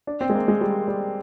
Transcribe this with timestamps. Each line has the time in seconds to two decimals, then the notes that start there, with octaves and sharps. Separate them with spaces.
0.07 D4
0.21 C4
0.30 G#3
0.35 A#3
0.48 G#3
0.61 G3
0.88 G3